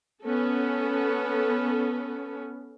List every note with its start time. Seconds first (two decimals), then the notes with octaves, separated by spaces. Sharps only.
0.24 B3 C#4 A4